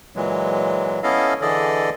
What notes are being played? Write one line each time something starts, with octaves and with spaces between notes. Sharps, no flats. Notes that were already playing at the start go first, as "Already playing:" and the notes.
A#2 E3 F#3 G#3
B3 C#4 E4 A4 D#5 F5
D3 E3 G#4 A4 D5 D#5